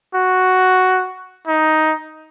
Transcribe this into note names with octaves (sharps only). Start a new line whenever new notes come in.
F#4
D#4